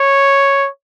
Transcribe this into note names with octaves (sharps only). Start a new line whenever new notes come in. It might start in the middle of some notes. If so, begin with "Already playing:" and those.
Already playing: C#5